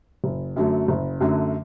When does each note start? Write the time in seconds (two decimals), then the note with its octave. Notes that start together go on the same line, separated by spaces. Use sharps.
0.24 F#1
0.56 F#2 D3 F#3 A3
0.88 F#1
1.20 F#2 D3 F#3 A3